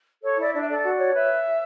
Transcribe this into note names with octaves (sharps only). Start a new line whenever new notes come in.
A4 C#5
E4 D5
D4 D5
E5
A4 D5
F#4
C#5
B4 E5